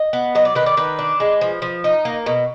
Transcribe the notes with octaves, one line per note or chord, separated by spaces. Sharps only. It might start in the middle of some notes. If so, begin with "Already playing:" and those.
Already playing: D#5
B3
F#3 D#5
D5
D#3 B4
D5
D#3 B4
D4
G#3
F3
F3
D#4
A#3
B2